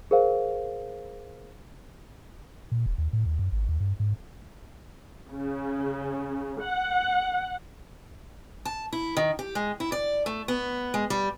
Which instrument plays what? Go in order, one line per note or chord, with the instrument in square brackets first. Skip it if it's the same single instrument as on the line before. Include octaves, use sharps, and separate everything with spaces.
[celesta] G#4 A#4 C5 F5
[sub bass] A#2
D#1
D#2
A2
D#2
F#2
G#1
D#2
G2
G#2
[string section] C#3
F#5
[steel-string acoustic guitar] A5
E4
D#3
G4
G#3
E4
D5
A3
B3
G#3
G3